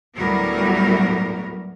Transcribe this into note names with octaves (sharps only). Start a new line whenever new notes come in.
D2 A2 F#3 G3 B3 A#4